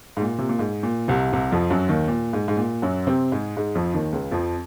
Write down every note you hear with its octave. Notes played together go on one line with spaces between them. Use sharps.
G#2
A#2
C3
A#2
G#2
A#2
C2 C3
C2 C3
F2 F3
F#2 F#3
D#2 D#3
A#2
G#2
G#2
A#2
F#2 F#3
C3 C4
G#2 G#3
G#2 G#3
F2 F3
D#2 D#3
C#2 C#3
F2 F3